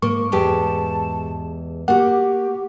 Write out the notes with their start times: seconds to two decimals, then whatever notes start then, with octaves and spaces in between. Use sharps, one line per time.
0.02 G#2 A#3 C#6
0.32 E2 G#3 G4 A5
1.88 A#3 F#4 G4 F#5